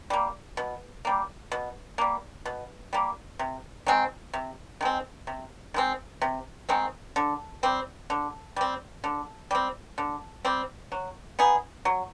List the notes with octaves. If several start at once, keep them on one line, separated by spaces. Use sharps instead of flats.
G3 A#3
B2
G3 A#3
B2
G3 A#3
B2
G3 A#3
C3
D#3 G#3 C4
C3
D#3 G#3 C4
C3
D#3 G#3 C4
C3
D#3 G#3 C4
D3
G3 C4
D3
G3 C4
D3
G3 C4
D3
G3 C4
F#3
B3 D#4 G#4
F#3